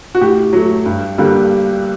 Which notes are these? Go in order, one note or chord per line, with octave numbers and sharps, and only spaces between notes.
F#4
A2 G4
F#3 A3
G2
D3 G3 A#3